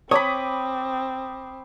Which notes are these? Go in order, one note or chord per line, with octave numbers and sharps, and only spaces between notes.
C4 C#5 B5 D6 D#6